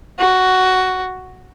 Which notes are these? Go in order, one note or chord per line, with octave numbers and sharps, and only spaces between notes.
F#4